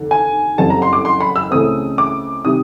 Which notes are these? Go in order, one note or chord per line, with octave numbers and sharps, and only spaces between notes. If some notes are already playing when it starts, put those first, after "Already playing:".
Already playing: F1 D#2 D3
G#5
F#1 F2 D3 G3 C4 A5
A#5
C6
D6
C6
B5
E6
C#2 C#3 E3 A3 C4 D#6
D6
C3 D#3 G3 D#6